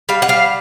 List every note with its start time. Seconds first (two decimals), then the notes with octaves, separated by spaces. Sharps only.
0.09 G3 F5
0.22 F#5
0.29 G3 F5